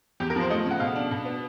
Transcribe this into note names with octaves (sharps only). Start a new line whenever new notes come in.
E2 G4
A#4
F3 C5
A3 D#5
C#3 F#5
B2 F5
D4
B2
B3